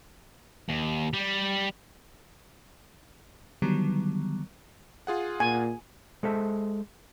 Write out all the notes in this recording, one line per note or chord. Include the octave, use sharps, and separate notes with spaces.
D#2
G3
D3 D#3 F#3 G3 B3
F4 G#4 F#5
A#2 G#5
G#3 A4 C5 E5